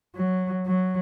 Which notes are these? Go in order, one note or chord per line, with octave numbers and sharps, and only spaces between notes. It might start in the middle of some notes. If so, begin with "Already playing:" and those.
F#3
F#3